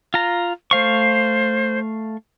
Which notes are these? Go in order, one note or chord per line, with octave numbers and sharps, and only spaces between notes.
F4 A#5
A3 C5 F5 C#6